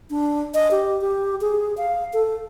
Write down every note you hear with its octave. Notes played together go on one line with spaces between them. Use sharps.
D4
D#5
G4
G4
G#4
F5
A4